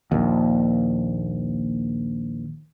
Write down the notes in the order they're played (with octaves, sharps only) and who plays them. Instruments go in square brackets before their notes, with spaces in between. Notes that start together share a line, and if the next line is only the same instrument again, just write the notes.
[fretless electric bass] A#1 D#2